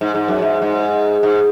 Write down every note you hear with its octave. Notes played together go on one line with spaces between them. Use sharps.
G#2
G#2
F#2
G#2
G#2
G#2